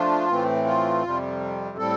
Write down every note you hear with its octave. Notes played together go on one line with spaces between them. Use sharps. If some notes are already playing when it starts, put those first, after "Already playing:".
Already playing: F3 A3 D4 F4
A2 E3 A3 C4
F4
F2 C3 G3
A2 G3 C4 A4